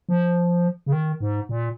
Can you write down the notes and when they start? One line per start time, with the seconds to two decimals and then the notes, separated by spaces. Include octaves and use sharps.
0.09 F3
0.86 C#3
0.92 D#3
1.20 G#2
1.49 A#2